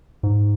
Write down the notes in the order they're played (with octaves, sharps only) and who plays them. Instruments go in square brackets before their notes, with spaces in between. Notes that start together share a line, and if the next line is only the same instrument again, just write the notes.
[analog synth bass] G#2